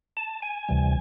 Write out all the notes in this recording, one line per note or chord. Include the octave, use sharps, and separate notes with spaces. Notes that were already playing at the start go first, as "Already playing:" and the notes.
A5
G#5
D2 C3 E3 G3